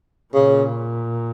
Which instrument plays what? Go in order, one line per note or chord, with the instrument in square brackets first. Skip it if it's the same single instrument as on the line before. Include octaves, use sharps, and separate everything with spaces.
[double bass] A#2 [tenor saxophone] C#3